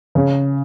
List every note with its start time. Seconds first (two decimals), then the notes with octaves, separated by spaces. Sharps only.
0.15 C#3